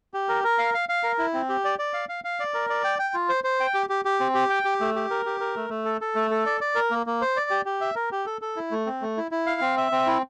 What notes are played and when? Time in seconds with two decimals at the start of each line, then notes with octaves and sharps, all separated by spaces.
0.14 G4
0.29 A#4
0.44 A#4
0.59 F5
0.74 F5
0.89 F5
1.03 A#4
1.18 E4
1.34 C4
1.49 G4
1.65 D5
1.79 D5
1.94 F5
2.09 F5
2.24 F5
2.40 D5
2.54 A#4
2.70 D5
2.84 G5
2.99 G5
3.14 F4
3.29 C5
3.44 C5
3.60 G5
3.74 G4
3.89 G4
4.05 G4
4.20 C4
4.35 G4
4.50 G5
4.65 G4
4.80 A3
4.96 G4
5.10 A#4
5.26 G4
5.40 A#4
5.56 A3
5.70 A3
5.85 A4
6.01 A4
6.15 A3
6.31 A4
6.46 D5
6.61 D5
6.75 A#4
6.91 A#3
7.06 A#3
7.22 C5
7.37 D5
7.50 G4
7.65 G4
7.81 E5
7.96 A#4
8.12 G4
8.26 A4
8.42 A4
8.56 E4
8.71 A3
8.86 C4
9.02 A3
9.17 E4
9.31 E4
9.47 F5
9.61 C4
9.77 E5
9.92 C4
10.07 E4